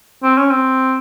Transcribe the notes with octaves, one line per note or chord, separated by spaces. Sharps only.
C4
C#4
C4